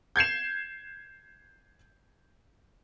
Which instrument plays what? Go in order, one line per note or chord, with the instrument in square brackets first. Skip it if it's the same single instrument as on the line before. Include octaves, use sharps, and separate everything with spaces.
[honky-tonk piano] G6 G#6 C7 E7